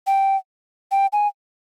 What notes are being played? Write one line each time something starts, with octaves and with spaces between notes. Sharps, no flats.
G5
G5
G#5